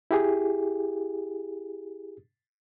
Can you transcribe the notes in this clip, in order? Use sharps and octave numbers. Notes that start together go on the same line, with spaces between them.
E4 G4 G#4